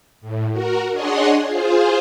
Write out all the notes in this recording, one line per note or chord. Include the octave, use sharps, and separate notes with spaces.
A2
F#4 A#4
D4 G#4 C#5 D#5 F#5 C6
F4 G#4 C5